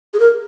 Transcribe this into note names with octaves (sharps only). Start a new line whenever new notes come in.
G#4
A#4